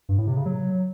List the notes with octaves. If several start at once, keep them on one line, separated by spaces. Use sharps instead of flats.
G2
A2
C3
C#3
F#3